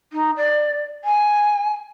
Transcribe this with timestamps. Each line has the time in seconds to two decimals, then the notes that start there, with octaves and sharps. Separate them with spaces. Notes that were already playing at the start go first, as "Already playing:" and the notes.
0.13 D#4
0.37 D5
1.04 G#5